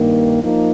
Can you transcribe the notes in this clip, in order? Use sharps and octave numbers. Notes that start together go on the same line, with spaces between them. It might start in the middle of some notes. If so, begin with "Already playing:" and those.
Already playing: G2 D#3 A#3
F3 A#3 D#4